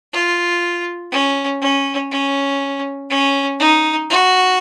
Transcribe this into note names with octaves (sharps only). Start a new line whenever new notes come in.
F4
C#4
C#4
C#4
C#4
D#4
F#4